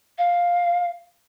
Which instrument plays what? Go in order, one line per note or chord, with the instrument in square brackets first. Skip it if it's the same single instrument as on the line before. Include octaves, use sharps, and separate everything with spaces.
[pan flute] F5